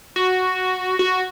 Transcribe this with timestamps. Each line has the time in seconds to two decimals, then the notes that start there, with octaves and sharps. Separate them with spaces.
0.16 F#4
0.99 F#4